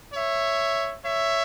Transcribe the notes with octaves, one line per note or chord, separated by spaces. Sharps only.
C#5 E5
C#5 E5